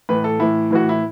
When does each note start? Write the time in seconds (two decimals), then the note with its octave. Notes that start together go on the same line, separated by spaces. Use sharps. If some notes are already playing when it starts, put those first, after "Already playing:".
0.09 A2 E3 B4
0.24 A4
0.40 A2 E3 E4
0.71 A2 E3 F#4
0.89 E4